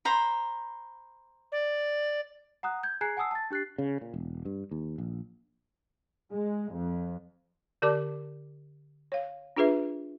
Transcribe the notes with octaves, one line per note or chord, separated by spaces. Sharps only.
C5 A#5 B5
D5
F#5 A#5 D#6 F#6
G6 G#6
G#4 G#5 A#5 F#6 G#6 C7
F#5 G#5 A5 D#6 E6 C7
A5 A6
D4 G4 F#6 A6 C7
C#3
A#2
E1
G2
D#2
A#1
G#3
F2
D3 G4 A#4 D5 A5 D6
C#5 F5
D4 F4 G#4 B4 E5